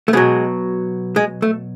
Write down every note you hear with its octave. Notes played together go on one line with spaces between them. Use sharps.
A3
B2 F#3 G#3
G#3
A3